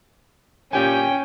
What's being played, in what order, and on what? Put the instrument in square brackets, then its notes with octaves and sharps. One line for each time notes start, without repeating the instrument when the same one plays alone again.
[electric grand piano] A#2 G4 G#5 [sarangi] C#4 [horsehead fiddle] G5